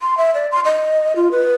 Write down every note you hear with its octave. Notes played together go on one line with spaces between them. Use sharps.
C6
E5
D5
C6
D#5
F4
B4